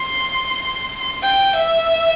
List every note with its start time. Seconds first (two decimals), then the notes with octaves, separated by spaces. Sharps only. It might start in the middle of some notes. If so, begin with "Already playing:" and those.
Already playing: C6
1.23 G5
1.56 E5